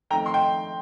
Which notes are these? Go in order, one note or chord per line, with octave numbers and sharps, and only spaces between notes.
F2 D#3 A3 G5 A#5
C6
G5